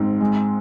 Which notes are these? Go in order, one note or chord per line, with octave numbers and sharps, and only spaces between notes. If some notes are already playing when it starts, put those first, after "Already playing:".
Already playing: G#2 C4
G#3